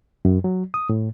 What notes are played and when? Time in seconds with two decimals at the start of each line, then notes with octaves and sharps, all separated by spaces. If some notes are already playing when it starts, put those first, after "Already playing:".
0.25 F#2
0.44 F#3
0.74 D#6
0.89 A2